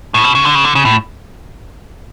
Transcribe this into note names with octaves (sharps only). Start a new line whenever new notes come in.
A2
B2
C#3
D3
C#3
D3
C#3
A2